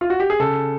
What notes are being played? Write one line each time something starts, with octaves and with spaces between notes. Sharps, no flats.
F4
F#4
G4
G#4
C#3 A4